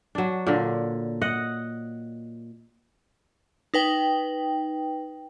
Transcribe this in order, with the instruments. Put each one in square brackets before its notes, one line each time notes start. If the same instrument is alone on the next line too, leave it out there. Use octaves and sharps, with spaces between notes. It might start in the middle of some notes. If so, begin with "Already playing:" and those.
[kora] F#3 D4
A#2 D3
D#5 F#5
[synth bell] D#4 B4 G5